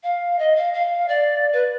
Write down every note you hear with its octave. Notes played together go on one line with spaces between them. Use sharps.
F5
D#5
F5
F5
D5
B4